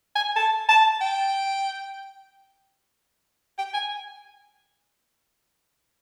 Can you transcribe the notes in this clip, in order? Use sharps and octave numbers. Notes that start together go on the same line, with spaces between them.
G#5
A5
A5
G5
G5
G#5